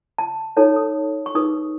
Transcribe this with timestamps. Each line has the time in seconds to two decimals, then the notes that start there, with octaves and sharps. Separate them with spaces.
0.18 A5
0.57 D#4 A4 C#5 A5
0.76 D#6
1.26 C#6
1.35 D#4 G#4 B4 D#6